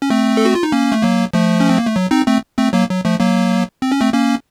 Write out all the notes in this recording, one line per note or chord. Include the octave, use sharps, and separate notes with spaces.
C#4
A3 C4
A4
F#4
F4
D#4
A#3 C#4
A3
F#3 A#3
F3 A3
C#4
C4
A#3
A3
F#3
C4 D#4
A3 C4
A3 C4
F#3 A#3
F#3
F3 A3
F#3 A#3
C4
C#4
A3 C4
A#3 C#4